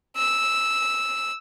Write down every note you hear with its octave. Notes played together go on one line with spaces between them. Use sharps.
E6